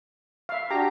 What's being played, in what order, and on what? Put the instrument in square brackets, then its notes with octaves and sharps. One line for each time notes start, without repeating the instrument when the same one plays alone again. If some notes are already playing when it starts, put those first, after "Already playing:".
[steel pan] E5 F5
[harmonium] D4 F#4 [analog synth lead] G4 [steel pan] A#5